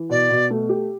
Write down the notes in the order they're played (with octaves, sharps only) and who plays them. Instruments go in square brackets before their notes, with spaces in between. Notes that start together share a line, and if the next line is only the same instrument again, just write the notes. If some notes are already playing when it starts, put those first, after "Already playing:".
Already playing: [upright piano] E3
[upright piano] B2 [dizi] D5
[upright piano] B2
A3
G4